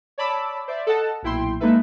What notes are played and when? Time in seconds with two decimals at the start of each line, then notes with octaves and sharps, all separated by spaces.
0.18 C#5 D5 A5 B5 D6 E6
0.68 C5 D5 E5
0.87 A4 D#5 F#5 A5
1.23 B1 A#2 E4 G5 C6
1.60 G#3 A#3 D#4 A4 B4 E5